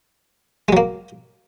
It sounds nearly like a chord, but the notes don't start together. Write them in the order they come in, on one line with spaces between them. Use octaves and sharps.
G#3 F#3 A#3